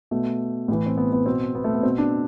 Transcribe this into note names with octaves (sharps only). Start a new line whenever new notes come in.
B2 A3
A2 E3
C4
B3
B3
B2 C4
B3
A3
B3
B2 C4
D4